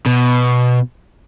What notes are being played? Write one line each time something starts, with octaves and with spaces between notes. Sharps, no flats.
B2